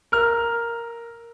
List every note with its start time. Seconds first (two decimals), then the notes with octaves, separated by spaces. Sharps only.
0.12 A#4 F6